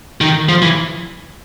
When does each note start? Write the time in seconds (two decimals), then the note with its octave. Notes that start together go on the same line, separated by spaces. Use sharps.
0.21 D#3
0.49 F3
0.62 E3